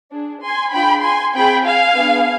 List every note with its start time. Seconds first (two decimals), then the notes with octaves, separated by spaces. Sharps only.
0.12 D4 G#4
0.42 G#5 C6
0.73 D4 F4 G#4 G5 B5
1.04 G#5 C6
1.34 C4 F4 G#4 G5 B5
1.65 F5 G#5
1.96 B3 D4 G#4